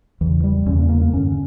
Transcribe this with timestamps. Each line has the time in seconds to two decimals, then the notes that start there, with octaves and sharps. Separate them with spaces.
0.21 E2 C#3 E3
0.44 G3
0.66 E2 C#3 C#4
0.78 A#3
0.89 A#3
1.01 A#3
1.13 G2 D3 C#4